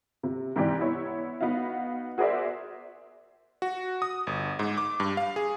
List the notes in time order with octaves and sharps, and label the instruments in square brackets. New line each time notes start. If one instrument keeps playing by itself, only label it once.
[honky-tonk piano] C3
G#2 C3 E3 G4 D5
B3 E4 C#5
B3 D#4 F#4 F5
F#4 G#4 A#4 C5 D5 E5
[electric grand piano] F#4
D#6
G1
G#2
D6
G2
F5
G#4